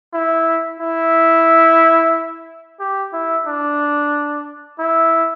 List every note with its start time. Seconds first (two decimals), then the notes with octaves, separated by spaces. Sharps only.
0.13 E4
0.80 E4
2.80 G4
3.13 E4
3.47 D4
4.79 E4